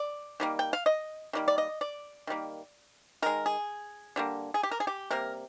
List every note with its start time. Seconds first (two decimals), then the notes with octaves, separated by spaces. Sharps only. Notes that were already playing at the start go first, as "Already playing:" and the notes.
Already playing: D5
0.40 D#3 G3 A#3
0.59 G5
0.73 F5
0.86 D#5
1.33 D#3 G3 A#3
1.48 D5
1.58 D#5
1.81 D5
2.27 D#3 G3 A#3
3.22 D#3 G#3 A#4
3.46 G#4
4.16 D3 G3 A#3
4.54 G#4
4.63 G4
4.71 A#4
4.80 G#4
4.87 G4
5.11 C3 G3 A#3 A#4